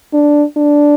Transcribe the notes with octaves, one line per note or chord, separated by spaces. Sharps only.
D4
D4